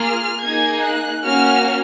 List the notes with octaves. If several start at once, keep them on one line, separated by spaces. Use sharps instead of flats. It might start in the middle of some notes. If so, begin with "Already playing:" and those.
Already playing: A#3 F4 G#4 F6
A#3 D#4 G#4 G#6
F#6
A#3 C#4 F#4 F6